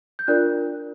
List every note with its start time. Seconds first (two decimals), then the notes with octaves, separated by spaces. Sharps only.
0.19 G6
0.27 D4 F4 A#4 D5 F#6